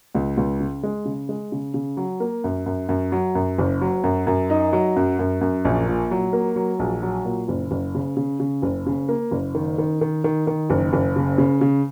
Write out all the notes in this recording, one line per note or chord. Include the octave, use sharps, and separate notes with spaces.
C#2
C#2
C#3
G#3
C#3
G#3
C#3
C#3
F#3
A#3
F#2
F#2
F#2
F#3
F#2
F#1
F#3
F#2
F#2
D#4
F#3
F#2
F#2
F#2
A#1
A#2
F#3
A#3
F#3
A#1
F#3
A#2
F#1
F#1
C#3
C#3
C#3
F#1
C#3
A#3
F#1
D#3
D#3
D#3
D#3
D#3
F#1
F#1
C#3
C#3
C#3